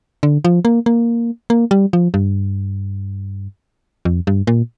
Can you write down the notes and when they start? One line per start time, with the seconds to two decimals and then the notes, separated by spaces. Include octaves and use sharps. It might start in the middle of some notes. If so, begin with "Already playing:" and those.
0.23 D3
0.45 F3
0.65 A#3
0.86 A#3
1.50 A#3
1.71 G3
1.93 F3
2.14 G2
4.05 F2
4.27 G2
4.47 A#2